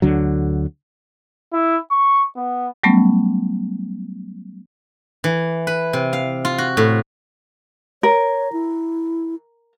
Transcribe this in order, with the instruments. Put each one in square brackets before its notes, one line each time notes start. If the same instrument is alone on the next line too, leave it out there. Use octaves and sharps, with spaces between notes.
[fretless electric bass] D2 D3 F#3
[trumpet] E4
C#6
B3
[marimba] F#3 G3 A3 B3 C#4
[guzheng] E3
B4
C3
F5
F4
F#4
A2
[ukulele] A#4 [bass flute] C#5
[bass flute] E4